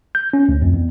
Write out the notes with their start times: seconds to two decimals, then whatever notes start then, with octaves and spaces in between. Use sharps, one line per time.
0.15 G6
0.33 C#4
0.49 D2
0.62 F2
0.74 E2